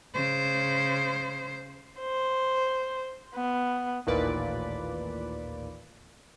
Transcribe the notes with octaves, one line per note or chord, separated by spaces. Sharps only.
C#3 C5
C5
B3
A1 D#2 A#2 B4 D5